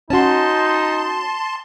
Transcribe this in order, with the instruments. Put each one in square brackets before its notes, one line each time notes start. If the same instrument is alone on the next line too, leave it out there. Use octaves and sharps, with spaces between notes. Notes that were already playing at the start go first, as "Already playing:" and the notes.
[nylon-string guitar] C#4 F#4 [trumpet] D#4 [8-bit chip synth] A5 C6